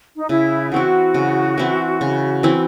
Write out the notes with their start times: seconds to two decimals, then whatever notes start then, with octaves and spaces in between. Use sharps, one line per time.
0.18 D#4
0.29 C#3 E4
0.72 E3 C4 E4 F#4
1.14 C#3
1.58 E3 C4 E4
2.01 C#3
2.43 E3 C4 E4